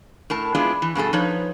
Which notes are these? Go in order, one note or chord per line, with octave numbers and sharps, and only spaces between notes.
A2 A#4 A5
G#3 B3 D4 E4 F4 G#4
E3
G2 B2 G#4 A4
F3 D#4 B4 C#5